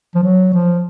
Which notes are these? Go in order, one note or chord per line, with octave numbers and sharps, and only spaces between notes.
F3
F#3
F3